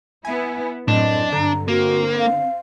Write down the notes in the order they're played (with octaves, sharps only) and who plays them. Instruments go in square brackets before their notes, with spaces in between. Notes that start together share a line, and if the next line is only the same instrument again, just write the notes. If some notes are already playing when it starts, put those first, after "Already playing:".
[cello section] B3 E4 [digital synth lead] G#5
[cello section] F#2 C4 [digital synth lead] A2 [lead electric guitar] D4 [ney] D#5
[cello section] G2 [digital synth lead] D3 [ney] A#5
[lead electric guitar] A#3 [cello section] C4 [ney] F#4
[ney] F5